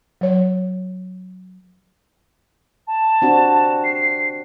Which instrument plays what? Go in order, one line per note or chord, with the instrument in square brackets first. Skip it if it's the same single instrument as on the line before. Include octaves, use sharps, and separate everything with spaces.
[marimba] F#3 C#5
[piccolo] A5
[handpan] C4 D4 F#4
[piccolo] C7